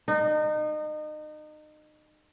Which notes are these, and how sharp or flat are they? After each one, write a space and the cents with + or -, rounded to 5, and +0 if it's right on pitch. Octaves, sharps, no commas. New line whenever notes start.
D#4 -30